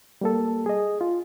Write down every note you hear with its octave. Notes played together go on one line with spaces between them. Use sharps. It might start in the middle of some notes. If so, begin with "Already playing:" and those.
G3 A#3 A4
G#4 D#5
F4